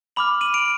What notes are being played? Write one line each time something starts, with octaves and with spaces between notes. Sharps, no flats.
B5 D6 F6 F#7
D#7 F#7
D7 F7